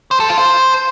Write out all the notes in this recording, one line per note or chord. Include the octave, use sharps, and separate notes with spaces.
C5
A4
F4
C5